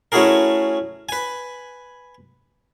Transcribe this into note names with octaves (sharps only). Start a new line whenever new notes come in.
A3 C#4 E4 F#4 G#4 A#4
B4 G#5